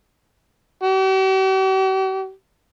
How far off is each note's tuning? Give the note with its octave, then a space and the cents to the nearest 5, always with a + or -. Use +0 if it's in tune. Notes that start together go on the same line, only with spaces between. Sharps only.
G4 -45